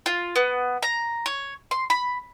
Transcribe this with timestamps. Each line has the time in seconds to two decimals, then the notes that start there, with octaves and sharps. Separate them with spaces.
0.06 F4
0.36 B3
0.83 A#5
1.26 C#5
1.71 C6
1.90 B5